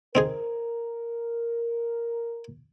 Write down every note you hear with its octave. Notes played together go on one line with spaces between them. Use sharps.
C4 D#4 G#4 A#4